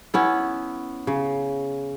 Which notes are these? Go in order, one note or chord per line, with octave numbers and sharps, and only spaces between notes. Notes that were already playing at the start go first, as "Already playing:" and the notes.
B3 C#4 E4
C#3